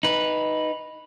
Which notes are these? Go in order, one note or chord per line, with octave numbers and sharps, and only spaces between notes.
D#4 B4